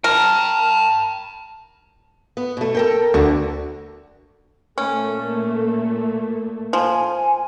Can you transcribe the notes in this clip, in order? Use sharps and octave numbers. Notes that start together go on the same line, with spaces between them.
A#4 G5 A5
B3
B2 A3
A4 A#4 G5
D2 D3 F#4
A#2 A3 A#3 C#4
F3 G#5